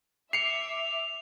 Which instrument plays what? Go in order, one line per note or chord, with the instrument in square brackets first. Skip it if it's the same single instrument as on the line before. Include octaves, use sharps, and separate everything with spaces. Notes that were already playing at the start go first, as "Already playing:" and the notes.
[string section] E5 D6 [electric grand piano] C7 C#7 [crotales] F7